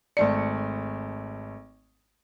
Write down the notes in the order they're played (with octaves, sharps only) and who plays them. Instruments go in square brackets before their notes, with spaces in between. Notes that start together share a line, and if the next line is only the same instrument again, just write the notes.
[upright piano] G#1 A3 C#7 [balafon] D5